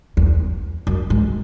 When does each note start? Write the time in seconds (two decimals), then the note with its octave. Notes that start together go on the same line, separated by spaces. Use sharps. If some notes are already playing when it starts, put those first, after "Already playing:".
0.17 E2
0.87 F#2
1.10 G#2